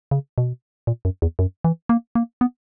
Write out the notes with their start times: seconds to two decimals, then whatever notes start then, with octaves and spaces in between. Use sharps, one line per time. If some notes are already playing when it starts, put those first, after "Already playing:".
0.11 C#3
0.38 B2
0.87 A#2
1.05 F#2
1.22 E2
1.39 F#2
1.64 E3
1.89 A#3
2.15 A#3
2.41 B3